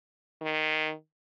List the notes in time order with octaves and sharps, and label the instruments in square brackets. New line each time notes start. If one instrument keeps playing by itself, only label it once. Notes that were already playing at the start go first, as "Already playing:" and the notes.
[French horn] D#3